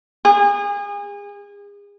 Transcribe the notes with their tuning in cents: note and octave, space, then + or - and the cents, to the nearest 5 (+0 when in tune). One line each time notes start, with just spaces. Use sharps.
G#4 -35